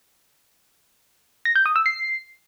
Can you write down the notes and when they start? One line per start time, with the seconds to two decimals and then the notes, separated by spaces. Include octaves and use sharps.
1.45 A#6
1.55 G6
1.66 D#6
1.76 E6
1.86 C7